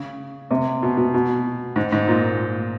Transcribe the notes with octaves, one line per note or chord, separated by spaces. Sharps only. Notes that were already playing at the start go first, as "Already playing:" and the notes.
Already playing: C#3
C3
B2
B2
B2
G#2
G#2
A#2